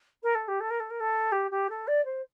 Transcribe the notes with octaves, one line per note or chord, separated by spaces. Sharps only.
A#4
A4
G4
A4
A#4
A4
A#4
A4
G4
G4
A4
D5
C5